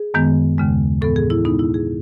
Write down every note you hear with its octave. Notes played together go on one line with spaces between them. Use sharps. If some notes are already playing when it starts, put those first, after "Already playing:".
Already playing: G#4
F#2 D#3 G#3 B3
D#2 C#3 G#3
A2 E3 B3 A4
G#4
E4
B2 G#3 B3 D#4
E4
G#4